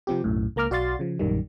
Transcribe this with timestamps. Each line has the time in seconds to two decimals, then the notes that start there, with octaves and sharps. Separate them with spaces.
0.07 C3 F3 C4 G4
0.24 B1 F#2 A2
0.56 C#2 A#3 A#5 D6 F6
0.70 B1 F#4 D5 F5 C6 A6
0.99 C#3 F3
1.19 A#1 F#2 D#3 G3